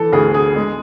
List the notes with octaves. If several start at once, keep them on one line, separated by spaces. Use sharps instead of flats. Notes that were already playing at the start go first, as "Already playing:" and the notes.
Already playing: E3 A4
D2 G#4
G#4
G#3